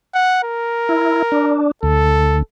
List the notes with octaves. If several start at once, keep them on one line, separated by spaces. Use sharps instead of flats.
F#5
A#4
E4
D4
D2 A4